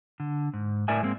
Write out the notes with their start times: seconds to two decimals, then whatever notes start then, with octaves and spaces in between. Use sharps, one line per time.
0.20 D3
0.53 G#2
0.88 A2 A#4 D5 E5 G#5
1.02 G#2 G#3 A#3 C4